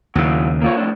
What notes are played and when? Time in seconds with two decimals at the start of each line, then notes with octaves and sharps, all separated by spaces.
0.15 D#2 C#3 F#3 E4
0.62 A#3 F4 C#5
0.77 F2 A2 D4